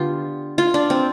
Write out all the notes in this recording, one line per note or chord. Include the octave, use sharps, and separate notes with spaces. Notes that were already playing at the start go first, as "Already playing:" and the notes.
Already playing: D3 B3 F4 G4
F4
D4
C4